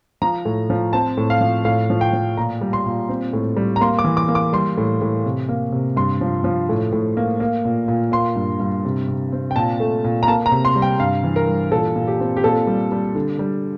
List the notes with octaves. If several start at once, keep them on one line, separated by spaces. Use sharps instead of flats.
F3 A#5
A2
F3
C4 A5
A2
F5
F3
A2 F5
F3
G5
F3
A#2 A#5
G3
C6
A#2
C4
A2
G3
A#5
A#3 C6
D6
E3
D6
A#3
D6
G3 C6
A2
A2
C3
A#3
C3
G2 C6
F3
F3
A2
A2
A#3
A#3
A#2
A#2
A#3 C6
G2
G2
C3
C3
C4
G5
A#2 A5
A3
A#2
A#5
A#3 A5
A#5
C3
C6
G3
G5
G2 F5
E3
A#4
G3
A#2 A4
A#2
G4
C4
G4
A#2 A4
G3
G3
D3
G3